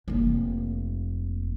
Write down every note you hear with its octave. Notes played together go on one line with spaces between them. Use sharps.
F1 A#3